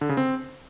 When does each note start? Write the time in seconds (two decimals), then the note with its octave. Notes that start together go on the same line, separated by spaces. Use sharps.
0.01 D3
0.09 C#3
0.17 C4